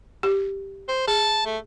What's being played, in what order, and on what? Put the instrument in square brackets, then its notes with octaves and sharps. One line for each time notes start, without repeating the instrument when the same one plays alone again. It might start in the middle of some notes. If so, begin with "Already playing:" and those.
[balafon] G4
[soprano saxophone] C5
[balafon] G#4 [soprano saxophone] A5
[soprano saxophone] A3